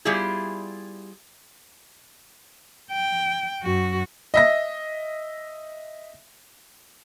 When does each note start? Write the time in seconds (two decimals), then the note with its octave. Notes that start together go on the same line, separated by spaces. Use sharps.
0.05 G3 B3 E4 F4 G4 G#4
2.91 G5
3.63 F#2 F#4
4.34 D#5 E5 A#6